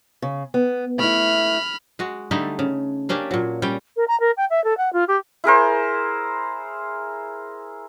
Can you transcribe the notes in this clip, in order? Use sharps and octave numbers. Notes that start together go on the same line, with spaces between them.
C#3
B3
A3 E4 B5 F6
G#3 F#4
D3 G3 A3 D#4
C#3
A#3 C#4 D4 G4
A#2 F#3
G3 C#4 G5
A#4
A#5
A#4
G5
E5
A4
F#5
F4
G4
E4 G#4 A#4 C5